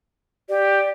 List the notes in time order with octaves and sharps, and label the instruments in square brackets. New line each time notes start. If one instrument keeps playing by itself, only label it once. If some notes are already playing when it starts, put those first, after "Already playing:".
[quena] G4 [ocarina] D5